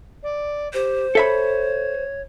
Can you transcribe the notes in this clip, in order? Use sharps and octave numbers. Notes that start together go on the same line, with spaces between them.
D5
G4 C5
A4 C#5 E5 B5